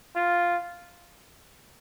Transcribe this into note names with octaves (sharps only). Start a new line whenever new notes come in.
F4